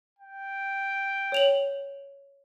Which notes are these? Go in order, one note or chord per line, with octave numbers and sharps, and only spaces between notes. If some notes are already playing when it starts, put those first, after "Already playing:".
G5
C#5 F7 F#7